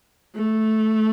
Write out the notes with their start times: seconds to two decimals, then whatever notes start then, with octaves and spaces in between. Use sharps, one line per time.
0.35 A3